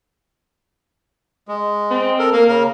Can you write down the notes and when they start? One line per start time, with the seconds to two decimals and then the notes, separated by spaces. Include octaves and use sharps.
1.48 G#3
1.90 C4
2.19 A4 A#4
2.32 A#3 A#4
2.48 C#3 A#4